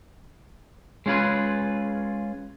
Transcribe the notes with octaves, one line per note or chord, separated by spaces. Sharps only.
G#3 C#4 F4 G#4 B4